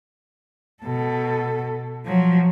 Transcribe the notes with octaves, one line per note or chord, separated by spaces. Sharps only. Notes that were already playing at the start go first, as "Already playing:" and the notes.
B2 A4
F3 F#3